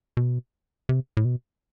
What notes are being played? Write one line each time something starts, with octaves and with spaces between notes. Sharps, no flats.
B2
C3
A2
B2